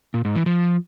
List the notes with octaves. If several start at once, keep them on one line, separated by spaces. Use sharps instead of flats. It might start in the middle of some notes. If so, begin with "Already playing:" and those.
A#2
G#2
E3
F3